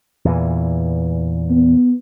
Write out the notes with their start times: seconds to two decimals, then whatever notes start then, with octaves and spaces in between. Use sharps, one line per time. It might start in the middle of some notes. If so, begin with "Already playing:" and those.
0.25 E2 A#2 E3
1.50 B3